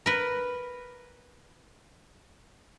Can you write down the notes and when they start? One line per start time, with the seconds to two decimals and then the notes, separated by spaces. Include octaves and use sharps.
0.06 A#4 B4